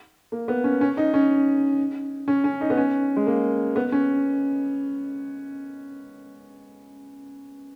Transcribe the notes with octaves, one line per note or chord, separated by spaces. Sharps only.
A#3
B3
C#4
C#4
D#4
C#4
C#4
C#4
D#4
B3
C#4
G#3
A#3
B3
C#4